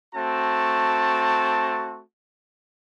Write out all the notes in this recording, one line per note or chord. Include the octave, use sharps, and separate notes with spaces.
A3 C4 F#4 A5